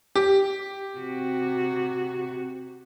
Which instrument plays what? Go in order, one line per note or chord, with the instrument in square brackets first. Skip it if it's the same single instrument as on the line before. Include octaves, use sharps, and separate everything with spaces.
[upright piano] G4
[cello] C3 F#4